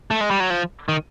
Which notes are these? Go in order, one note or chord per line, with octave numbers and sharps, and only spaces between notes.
A3
G#3
G3
F#3
F3
D#3